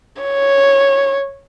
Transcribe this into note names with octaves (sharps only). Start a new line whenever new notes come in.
C#5